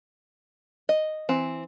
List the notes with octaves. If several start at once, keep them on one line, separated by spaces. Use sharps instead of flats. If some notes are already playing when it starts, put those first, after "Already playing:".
D#5
E3 C4